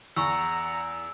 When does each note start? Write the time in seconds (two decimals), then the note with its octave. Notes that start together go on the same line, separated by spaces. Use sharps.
0.16 E2 F#5 A#5 B5 C#6 E6